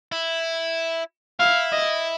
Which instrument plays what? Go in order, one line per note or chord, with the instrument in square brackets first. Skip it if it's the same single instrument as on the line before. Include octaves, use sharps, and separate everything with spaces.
[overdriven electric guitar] E4
[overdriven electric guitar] E4 [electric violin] F5
[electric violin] D#5